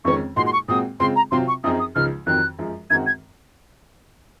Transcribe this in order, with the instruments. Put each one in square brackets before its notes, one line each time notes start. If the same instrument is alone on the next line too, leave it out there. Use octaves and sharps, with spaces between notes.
[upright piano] F2 D#3 G#3 C#4 [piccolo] C#6
[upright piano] A#2 G#3 D#4 F#4 [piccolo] C6
[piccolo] C6
C#6
[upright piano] A#2 G#3 C4 F#4 [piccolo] D#6
[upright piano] C#3 G#3 C4 F4 [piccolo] C6
[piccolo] A#5
[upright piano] C3 F#3 C4 F4 [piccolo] C6
[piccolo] C#6
[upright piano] F#2 F3 C4 D#4 G#4 [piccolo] D#6
[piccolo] D#6
[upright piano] C#2 C#3 F3 G#3 D#4 [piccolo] F6
[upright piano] F2 D#3 F#3 C4 [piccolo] F#6
[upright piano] F#2 F3 G#3
[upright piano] F#2 D#3 G#3 C4 F#4 [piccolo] G#6
[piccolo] G#6